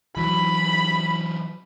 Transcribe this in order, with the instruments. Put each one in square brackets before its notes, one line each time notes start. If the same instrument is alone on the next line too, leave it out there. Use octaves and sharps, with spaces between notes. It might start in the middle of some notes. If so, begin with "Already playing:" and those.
[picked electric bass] E3 F#3 [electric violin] B5